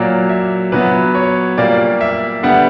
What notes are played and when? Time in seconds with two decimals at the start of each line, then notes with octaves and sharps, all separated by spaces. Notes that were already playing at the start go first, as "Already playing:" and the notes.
Already playing: A#2 F#3 A#3 D5
0.29 E5
0.72 A#2 F#3 B3 B4
1.15 C#5
1.58 A#2 G3 A#3 D5
2.01 E5
2.43 D3 G3 B3 F#5